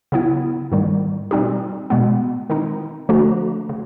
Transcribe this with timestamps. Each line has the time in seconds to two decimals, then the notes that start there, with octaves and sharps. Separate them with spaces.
0.12 C#3 F#3 B3 E4
0.71 G#2 D#3 G3
1.31 B2 G3 C4 D#4 G4
1.90 B2 G#3 B3
2.49 D#3 G#3 C4 D#4
3.09 D3 F3 A3 D4 F#4
3.69 C#3